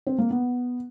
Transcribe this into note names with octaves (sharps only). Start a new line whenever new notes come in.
C4
A#3
B3